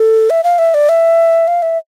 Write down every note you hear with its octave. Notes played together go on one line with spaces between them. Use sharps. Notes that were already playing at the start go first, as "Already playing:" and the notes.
Already playing: A4
E5
F5
E5
D5
E5
F5
E5